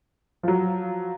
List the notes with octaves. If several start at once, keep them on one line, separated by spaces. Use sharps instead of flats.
F3 F#3